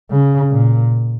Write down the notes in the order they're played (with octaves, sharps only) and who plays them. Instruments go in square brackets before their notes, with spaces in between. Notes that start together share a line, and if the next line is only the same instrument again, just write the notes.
[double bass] C#3
A#2